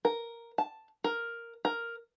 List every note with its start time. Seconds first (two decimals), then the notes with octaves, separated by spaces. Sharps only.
0.05 A#4
0.58 A5
1.04 A#4
1.65 A#4